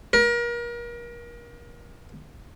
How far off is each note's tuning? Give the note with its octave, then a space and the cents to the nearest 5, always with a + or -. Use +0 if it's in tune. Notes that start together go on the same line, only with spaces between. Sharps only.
A#4 +35